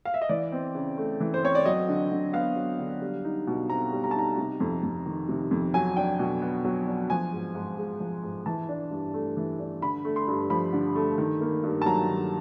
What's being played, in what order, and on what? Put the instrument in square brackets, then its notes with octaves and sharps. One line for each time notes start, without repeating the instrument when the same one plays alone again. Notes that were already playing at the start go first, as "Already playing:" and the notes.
[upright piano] F5
E5
D#5
E3 D5
C4
C#3
A3
E3
C5
C4 C#5
D5
F#3 D#5
D3
D3
B3 F5
F#3
D3
G3
D#4
B2
C4 A#5
G3
A#5
A5
D#4 A#5
C3
F2
F2
D#3
C3
F2
F#3 G#5
D4 G5
B2
B3
F#3
D4
F3 G#5
G#2
G#2
G#3
F3
G#2
E3 A5
D4
G2
A3
E3
D4
D3 B5
A3
C6
G2
F3 B5
D3
A3
D#3
A#3
G2
A5
F#3 A#5
D#3